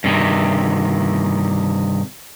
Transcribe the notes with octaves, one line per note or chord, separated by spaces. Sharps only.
G2 C3 D#3